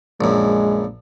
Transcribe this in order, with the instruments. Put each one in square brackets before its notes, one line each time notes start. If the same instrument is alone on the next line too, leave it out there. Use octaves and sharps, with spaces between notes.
[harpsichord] A#1 F#2 [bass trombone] G#3